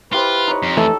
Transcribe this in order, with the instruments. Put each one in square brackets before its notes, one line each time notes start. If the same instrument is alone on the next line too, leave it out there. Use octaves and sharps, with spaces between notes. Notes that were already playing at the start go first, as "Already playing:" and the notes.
[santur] E4 G4 C5 [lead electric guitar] F4 [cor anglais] B4
[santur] D#4 C#5
[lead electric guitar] F2
[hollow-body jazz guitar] E3 A3 [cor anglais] A4